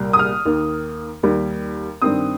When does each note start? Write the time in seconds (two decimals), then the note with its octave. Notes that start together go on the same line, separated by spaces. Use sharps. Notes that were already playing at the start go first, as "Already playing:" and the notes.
Already playing: C2 A#2 G3
0.13 D#6
0.19 F6
0.45 D#2 D#3 A#3
1.23 D#2 D#3 G3
2.02 G2 D#3 C4 D#6